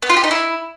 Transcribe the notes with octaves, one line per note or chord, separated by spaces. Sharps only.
B3
F4
G4
D#4
E4